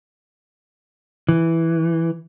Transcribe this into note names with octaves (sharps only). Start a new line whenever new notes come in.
E3